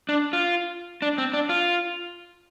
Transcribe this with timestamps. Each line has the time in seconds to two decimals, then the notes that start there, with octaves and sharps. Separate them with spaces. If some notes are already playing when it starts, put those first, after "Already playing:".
0.09 D4
0.33 F4
1.02 D4
1.18 C4
1.34 D4
1.49 F4